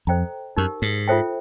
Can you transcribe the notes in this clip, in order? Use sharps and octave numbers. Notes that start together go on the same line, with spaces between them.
F2 A4 C5 D#5 G5 A#5
F#2 D#4 G4 A#4
G#2
F4 A4 C5 E5 G5